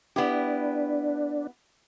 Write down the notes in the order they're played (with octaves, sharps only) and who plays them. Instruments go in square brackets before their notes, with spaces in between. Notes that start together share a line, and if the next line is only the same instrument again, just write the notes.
[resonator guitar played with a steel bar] B3 E4 G4 [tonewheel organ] D4